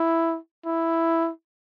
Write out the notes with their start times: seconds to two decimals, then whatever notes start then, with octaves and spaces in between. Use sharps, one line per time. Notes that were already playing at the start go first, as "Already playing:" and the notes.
Already playing: E4
0.65 E4